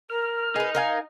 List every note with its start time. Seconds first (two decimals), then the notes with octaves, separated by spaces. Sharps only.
0.10 A#4 F6
0.56 D#4 G#4 B4
0.75 A#4 F5 G#5